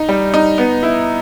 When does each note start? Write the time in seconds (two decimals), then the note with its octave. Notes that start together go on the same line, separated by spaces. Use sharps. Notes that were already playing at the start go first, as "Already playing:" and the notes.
Already playing: D#4
0.09 G3
0.34 D#4
0.58 B3
0.83 E4